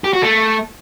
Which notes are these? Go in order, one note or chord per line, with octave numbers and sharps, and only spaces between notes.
G4
F#4
A3